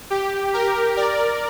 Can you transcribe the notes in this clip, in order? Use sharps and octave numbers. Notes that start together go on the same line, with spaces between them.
G4
G4 A#4
A#4 D5